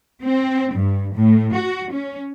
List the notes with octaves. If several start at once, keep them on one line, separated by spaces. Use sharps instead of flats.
C4
G2
A2
F#4
C#4